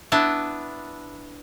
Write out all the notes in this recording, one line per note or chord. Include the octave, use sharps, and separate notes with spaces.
B3 D4 E4